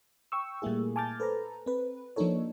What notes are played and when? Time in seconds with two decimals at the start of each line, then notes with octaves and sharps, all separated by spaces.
0.32 G5 C#6 E6
0.62 A#2 G3 A3 A#3 E4 G#4
0.96 G#5 A5 D6 F6 G6 A6
1.20 A4 B4 C5 A#5
1.66 C4 B4
2.16 F3 A#3 D4 D#4 A4 C#5